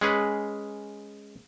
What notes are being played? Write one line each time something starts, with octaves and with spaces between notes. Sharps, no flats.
G#3 C#4 G#4 B4